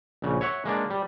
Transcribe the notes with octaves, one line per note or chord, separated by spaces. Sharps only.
A#1 C#3
C#5 E5 F#5
G#3 A#3 D4
G3